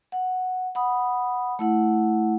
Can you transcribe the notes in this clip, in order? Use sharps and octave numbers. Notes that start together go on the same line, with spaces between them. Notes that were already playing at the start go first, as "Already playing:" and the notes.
F#5
F#5 B5 D#6
A3 E4 F#5